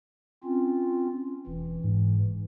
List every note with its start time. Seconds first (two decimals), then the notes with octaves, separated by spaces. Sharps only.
0.44 C4 C#4 F4
1.47 E1 E3
1.84 G#2